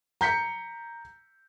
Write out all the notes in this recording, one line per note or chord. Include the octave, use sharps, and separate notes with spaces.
A#5 G6 B6 C#7